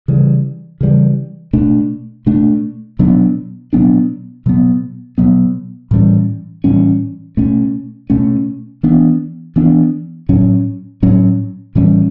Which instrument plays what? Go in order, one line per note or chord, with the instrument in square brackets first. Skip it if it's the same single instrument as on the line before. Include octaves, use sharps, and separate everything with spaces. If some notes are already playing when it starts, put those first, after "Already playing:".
[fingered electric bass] C#3 E3 G3
C#3 E3 G3
B2 A3 D4
B2 A3 D4
B2 F#3 B3 D4
B2 F#3 B3 D4
B2 F#3 B3
B2 F#3 B3
A2 E3 G3 C#4
A2 E3 G3 C#4
B2 A3 C#4
B2 A3 C#4
E3 B3 D4
E3 B3 D4
A2 F#3 C#4
A2 F#3 C#4
A2 E3 G3 C#4